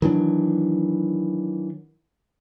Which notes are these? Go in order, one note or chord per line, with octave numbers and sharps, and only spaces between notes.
D#3 E3 F#3 D4